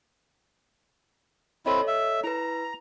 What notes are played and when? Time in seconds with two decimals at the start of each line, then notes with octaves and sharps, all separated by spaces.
1.66 C4 E4 A4 C#5 D#5
1.87 E5
2.24 E4 B4 A#5